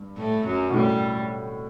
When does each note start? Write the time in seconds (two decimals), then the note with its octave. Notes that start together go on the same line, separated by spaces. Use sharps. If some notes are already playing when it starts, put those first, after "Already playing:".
Already playing: G2
0.17 A2 A3
0.46 F#2 F#3
0.70 B2
0.74 A2 G3